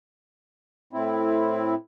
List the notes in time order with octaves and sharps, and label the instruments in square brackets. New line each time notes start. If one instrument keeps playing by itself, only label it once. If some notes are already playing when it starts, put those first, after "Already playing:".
[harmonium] A2 C4 E4